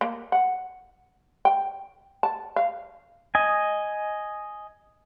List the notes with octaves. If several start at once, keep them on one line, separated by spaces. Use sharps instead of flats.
A#3
F#5
G5
A5
F5
D#5 G#5